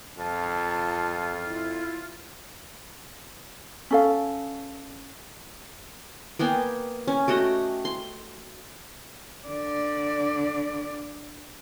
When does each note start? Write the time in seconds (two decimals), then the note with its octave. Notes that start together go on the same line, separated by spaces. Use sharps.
0.18 F2 F4 A5
1.45 E4
3.91 C#4 A4 F5
6.39 A#3 B3 G5 G#5
7.08 C#4
7.28 A3 F#4 G4 D#5
7.85 C6
9.48 D3 D5